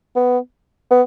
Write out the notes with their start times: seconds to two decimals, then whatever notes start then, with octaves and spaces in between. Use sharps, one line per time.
0.16 B3
0.91 B3